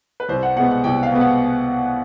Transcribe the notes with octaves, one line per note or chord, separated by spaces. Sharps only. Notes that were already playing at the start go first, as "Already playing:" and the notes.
B4
C2 C5
F#5
B2 G#3 B3 F#5
F#5
C2 G5
F5
B2 G#3 B3
F#5